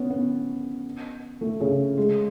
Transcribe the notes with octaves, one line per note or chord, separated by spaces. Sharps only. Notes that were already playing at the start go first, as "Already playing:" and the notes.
Already playing: B3 C#4
B3
A3
C#3
G#3